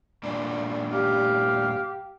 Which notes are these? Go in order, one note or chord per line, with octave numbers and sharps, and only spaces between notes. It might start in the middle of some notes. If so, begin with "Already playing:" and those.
G2 A#2 D4
G4 F5